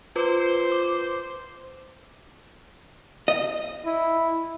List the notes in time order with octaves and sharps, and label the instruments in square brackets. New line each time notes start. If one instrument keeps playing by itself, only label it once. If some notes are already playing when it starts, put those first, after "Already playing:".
[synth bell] F4 B4 D6 [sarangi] C5
[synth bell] D6
[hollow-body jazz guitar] D#5
[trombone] E4